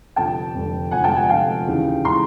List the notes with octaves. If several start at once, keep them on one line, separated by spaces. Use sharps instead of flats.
F1 F2 D3 G5 A5
F1 F2 D3
F1 F2 D3 F#5 G#5
G5 A5
F#5 G#5
F1 F2 D3 F5 G5
D#2 C#3 E3
C#3 E3 A#5 C6